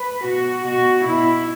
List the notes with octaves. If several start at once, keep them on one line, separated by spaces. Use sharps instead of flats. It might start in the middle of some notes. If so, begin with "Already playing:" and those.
Already playing: B4
B2 F#4
B2 F#4
B2 E4